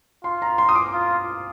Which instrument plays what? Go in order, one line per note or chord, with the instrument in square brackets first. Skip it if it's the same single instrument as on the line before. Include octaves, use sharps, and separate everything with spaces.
[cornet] F4 [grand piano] C6
[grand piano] A#5
C6
D#6
D6
[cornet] F4